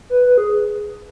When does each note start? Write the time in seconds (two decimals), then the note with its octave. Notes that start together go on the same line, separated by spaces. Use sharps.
0.10 B4
0.26 B4
0.38 G#4